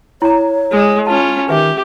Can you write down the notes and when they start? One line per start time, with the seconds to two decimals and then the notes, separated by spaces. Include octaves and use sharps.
0.22 E4 C#5 A#5
0.72 G#3
1.07 C#4 F4 A5
1.49 D#3 G4 B4 E5